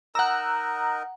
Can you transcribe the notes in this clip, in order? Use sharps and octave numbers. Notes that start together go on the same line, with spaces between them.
D#4 A#4 D#5 F#5 A#5 E6 F#6